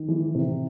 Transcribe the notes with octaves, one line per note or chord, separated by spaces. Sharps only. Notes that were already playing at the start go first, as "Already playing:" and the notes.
Already playing: D#3
E3
C3